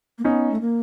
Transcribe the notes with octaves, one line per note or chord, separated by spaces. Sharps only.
A#3
B3 C#4 D#4
A3
A#3